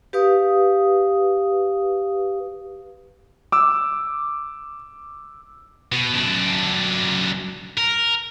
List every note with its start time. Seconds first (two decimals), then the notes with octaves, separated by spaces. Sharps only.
0.13 G4 B4 F5 D#6
3.52 D6 E6
5.92 B2
6.14 F#2 D4
7.78 A#4